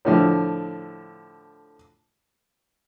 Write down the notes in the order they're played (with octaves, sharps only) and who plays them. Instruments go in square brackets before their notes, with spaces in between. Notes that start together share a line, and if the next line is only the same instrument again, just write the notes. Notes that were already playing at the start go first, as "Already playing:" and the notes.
[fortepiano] A2 D3 F3